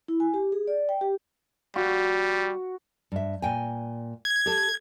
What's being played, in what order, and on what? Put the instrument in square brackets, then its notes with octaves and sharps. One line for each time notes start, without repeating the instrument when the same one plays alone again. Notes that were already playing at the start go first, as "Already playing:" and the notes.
[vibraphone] E4
G#5
G4
G#4
D5
G5
G4
[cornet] G3 [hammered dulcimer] F#4
[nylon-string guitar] G2 E5
A#2 G5 G#5
[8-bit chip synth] G#6
[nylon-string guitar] G4 A4